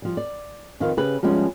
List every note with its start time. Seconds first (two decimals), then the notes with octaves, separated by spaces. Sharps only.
0.02 F3 G3
0.17 D5
0.80 F2 D#3 B4 C5 F5
0.97 C#3 G4 B4
1.23 F3 G3 G#3 B3 C#4